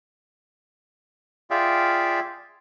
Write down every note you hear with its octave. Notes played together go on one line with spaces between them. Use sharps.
F4 G#4 D5 E5 F5 G5